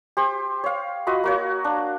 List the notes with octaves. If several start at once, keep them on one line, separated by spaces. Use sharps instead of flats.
G4 C5
C#5 F5
F4 F#4 D#5 B5
A#3 F#4 C#5
D4